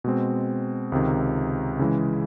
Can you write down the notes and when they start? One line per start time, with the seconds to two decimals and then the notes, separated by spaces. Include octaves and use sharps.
0.04 B2 G#3 C4
0.92 C#2 C3 D#3
1.79 C#3 E3 G#3